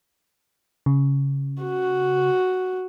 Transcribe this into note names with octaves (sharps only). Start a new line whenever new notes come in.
C#3
F#4